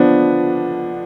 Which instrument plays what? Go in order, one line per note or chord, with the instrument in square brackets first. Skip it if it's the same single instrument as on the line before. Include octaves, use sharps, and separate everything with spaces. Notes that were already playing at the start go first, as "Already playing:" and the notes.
Already playing: [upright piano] D3 F3 B3 D4